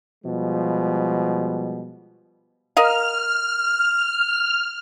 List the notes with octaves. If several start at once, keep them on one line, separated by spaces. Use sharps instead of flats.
B2 F3 G3 G#3
A#4 D#5 F5 F6